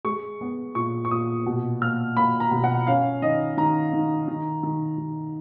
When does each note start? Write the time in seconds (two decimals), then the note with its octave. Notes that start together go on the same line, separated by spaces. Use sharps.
0.05 G#3 C#6
0.41 B3
0.75 A#2 C#6
1.05 C#6
1.11 A#2 D#6
1.46 B2
1.81 A#3 F6
2.17 A#3 B5
2.40 A#5
2.51 B2
2.64 F#5
2.87 C#4 F5
3.22 D#3 D#5
3.57 D#3 A#5
3.93 D#3
4.28 D#3
4.63 D#3
4.98 D#3